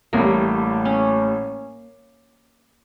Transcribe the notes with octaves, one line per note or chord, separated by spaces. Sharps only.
A1 A2 G3 A#3
C#4